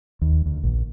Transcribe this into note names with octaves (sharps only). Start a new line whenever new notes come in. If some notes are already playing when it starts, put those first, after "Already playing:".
D#2
D2
A#1